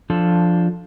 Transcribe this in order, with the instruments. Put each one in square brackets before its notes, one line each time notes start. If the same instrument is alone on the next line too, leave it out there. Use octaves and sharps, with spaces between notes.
[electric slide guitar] F3 D4 F4 A4